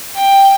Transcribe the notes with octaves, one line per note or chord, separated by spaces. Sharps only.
G5